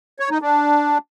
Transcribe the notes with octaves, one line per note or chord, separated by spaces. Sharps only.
C#5
D#4
D4